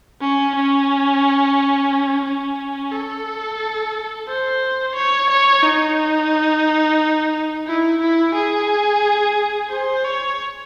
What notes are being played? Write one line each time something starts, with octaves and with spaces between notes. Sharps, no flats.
C#4
C#4
C#4
A4
C5
C#5
C#5
D#4
E4
E4
G#4
C5
C#5